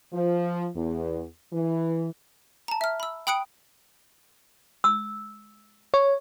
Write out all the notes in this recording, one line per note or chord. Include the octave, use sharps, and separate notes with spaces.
F3
E2
E3
A5 A#5
E5 F6
B5 E6
G5 B5 D#6 F#6 C#7 D7
E6
C#5